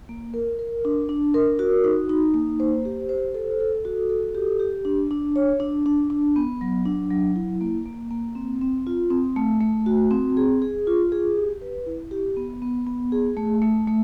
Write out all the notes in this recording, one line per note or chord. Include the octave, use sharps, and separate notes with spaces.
A#3
A#4
A#4
D4
D4
A#4
F#4
D#4
D#4
A#3
C5
G4
C5
A4
A4
F#4
A4
G4
G4
D4
D4
C#5
D4
D4
D4
B3
F#3
D4
F#3
E4
A#3
A#3
A#3
C4
C4
F4
C4
A3
A3
F#4
C4
G#4
G#4
F4
G#4
G4
B4
E4
G4
B3
B3
B3
G#4
A3
A3
A3